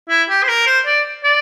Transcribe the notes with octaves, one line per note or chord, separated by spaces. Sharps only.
E4
G4
C5
A#4
C5
D5
D5